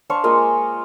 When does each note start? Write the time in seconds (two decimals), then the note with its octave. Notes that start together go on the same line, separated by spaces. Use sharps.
0.10 D4 C5 F5 C#6
0.24 G#3 A#3 F4 D#5